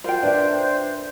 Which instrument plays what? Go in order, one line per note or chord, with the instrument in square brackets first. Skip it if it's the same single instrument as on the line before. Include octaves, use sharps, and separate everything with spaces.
[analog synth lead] F4 [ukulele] A#4 G5 [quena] C5
[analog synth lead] D4 [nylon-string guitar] B4 E5